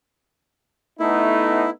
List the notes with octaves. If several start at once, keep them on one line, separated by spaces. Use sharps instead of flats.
A3 B3 D#4 E4